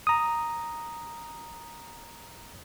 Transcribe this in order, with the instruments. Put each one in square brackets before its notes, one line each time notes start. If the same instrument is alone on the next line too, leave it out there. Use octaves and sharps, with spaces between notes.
[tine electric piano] A#5 D#6